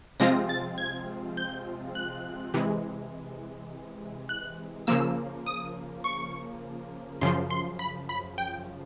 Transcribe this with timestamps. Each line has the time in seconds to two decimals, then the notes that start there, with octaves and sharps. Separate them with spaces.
0.20 C3 F3 G#3 C4 F4 A#6
0.49 A6
0.78 G#6
1.37 G6
1.95 F#6
2.54 C3 E3 G#3
4.29 F#6
4.87 C#3 F3 A#3 E6
5.46 D#6
6.04 C#6
7.21 F#2 C#3 F3 C6
7.50 C6
7.79 B5
8.09 B5
8.38 G5